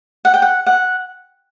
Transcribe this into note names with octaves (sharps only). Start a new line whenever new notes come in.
F#5
G5
F#5
F#5